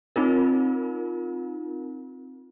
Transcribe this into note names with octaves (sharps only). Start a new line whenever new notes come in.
C4 D#4 F4 A#4